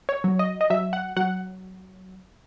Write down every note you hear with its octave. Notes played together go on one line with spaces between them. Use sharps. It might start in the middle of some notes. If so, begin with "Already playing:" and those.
C#5
F#3
D#5
D#5
F#3 E5
F#5
F#3 F#5